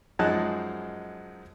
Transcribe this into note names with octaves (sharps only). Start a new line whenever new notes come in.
F#2 F3 G#3 D#4 A5 F#6